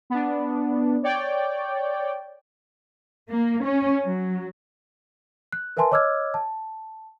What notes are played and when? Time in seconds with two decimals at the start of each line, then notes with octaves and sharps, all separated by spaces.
0.10 B3 D4
1.03 C#5 D5 G5
3.28 A#3
3.64 C#4
4.04 F#3
5.52 F#6
5.77 A#4 B4 E5 G#5 A5 C6
5.91 C#5 D#5 D6 E6 F6 G#6
6.34 A5